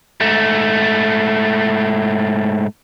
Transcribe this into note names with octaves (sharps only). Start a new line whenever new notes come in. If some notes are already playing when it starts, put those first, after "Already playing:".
G#2 A3